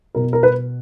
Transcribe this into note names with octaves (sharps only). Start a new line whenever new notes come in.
B2 A#4
A#4
B4